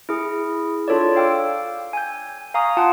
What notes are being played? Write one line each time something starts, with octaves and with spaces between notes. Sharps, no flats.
E4 G#4
D4 F4 A4 C#5 D5
F5 G5 D6 E6
G#5 G6
F5 G#5 A#5 C#6 D#6
F4 F#5 G5 A5